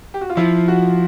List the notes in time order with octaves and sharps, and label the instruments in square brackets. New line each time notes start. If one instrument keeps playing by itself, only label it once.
[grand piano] G4
F#4
F4
[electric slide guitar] F3 [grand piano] E4
[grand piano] F#4